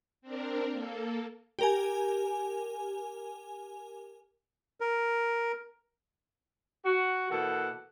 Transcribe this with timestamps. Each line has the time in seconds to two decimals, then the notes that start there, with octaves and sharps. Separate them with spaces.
0.22 C4 D4 A#4
0.70 A#3 A4
1.59 G4 A#4 G#5
4.80 A#4
6.85 F#4
7.30 B2 E3 A#3 A4 F#5